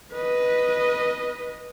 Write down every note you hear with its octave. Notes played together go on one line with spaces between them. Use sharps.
B4 D#5